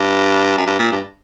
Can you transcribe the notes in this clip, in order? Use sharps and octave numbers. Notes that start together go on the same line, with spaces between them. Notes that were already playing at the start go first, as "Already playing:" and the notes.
Already playing: G2
F#2
G2
A#2
G2